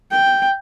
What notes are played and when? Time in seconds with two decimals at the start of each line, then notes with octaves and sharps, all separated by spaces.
0.11 G5